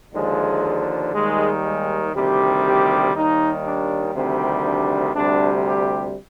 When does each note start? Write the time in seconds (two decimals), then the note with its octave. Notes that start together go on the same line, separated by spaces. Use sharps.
0.14 D#2 D3 F3 G#3
1.14 D#2 D#3 G3 G#3
1.63 G#3
2.14 D2 C3 D#3 G3 G4
2.64 G4
3.15 D#2 D#3 G3 D#4
3.65 D4
4.14 D2 C3 D#3 G3 C4
4.65 D4
5.15 D2 C3 G3 D4
5.65 G4